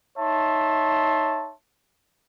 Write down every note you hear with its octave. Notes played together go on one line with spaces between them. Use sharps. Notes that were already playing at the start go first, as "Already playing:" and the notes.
D#4 C#5 E5 A5 C6